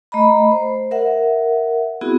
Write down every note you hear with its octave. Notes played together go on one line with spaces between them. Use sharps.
A3 D#5 A#5 B5
C5
A#4 E5 F#5
B3 C4 E4 F#4 G#4